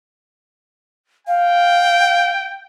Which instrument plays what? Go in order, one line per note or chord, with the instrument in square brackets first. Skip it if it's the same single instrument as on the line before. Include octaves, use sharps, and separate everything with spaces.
[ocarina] F5 [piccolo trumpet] G5